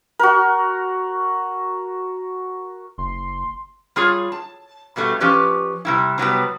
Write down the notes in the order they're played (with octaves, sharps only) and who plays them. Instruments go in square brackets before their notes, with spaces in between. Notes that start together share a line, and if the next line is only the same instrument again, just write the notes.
[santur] F#4 A#4
[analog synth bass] F#1 [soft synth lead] C6
[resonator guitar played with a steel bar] G3 F4 G#4 C#5
A5
G2 B2 G3 A3
F3 C#4 G4 B4 D5
C3 G3 E4
C3 F#3 G3 B3